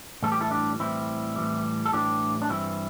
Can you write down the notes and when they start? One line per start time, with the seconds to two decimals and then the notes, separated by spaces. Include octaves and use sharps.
0.23 A2 E3 G3 A4
0.32 G4
0.41 E4 A4
0.51 D4 G4
0.79 A2 E3 G3 C4 E4
1.36 A2 E3 G3
1.86 A4
1.93 A2 E3 G3 D4 G4
2.42 D4
2.49 G2 E3 G3 C4 E4